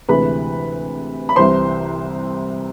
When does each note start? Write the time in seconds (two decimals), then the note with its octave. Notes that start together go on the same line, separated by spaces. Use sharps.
0.08 D2 C3 E3 G#3 B4 B5
1.29 B5
1.36 C2 C3 E3 C5 C6